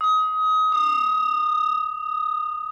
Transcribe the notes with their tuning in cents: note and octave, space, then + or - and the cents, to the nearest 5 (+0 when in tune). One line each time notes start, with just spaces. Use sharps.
D#6 +25
D#6 -25